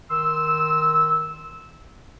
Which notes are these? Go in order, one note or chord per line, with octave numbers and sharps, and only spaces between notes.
D#3 C6 E6